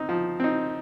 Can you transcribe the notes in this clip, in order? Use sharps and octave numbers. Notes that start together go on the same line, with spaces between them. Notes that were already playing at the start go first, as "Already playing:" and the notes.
Already playing: C4 D#4
F3
C4 D#4